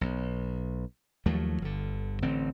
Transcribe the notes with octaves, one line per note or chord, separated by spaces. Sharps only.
B1
D#2 F3 F#3 A3
G1 D3
A1 D3 C4